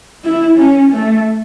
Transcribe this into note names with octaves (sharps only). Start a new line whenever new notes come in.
E4
C#4
A3